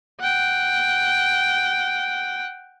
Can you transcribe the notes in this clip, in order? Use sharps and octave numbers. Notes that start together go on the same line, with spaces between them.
F#5 G5